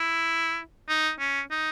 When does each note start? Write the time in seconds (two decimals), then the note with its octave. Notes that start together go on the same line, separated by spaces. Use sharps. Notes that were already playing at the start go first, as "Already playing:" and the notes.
Already playing: E4
0.88 D#4
1.19 C#4
1.51 D#4